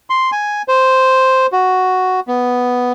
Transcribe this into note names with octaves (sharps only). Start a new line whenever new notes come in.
C6
G#5
C5
F#4
B3